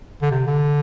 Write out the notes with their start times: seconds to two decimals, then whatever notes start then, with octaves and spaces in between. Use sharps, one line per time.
0.22 D3
0.31 C3
0.47 D3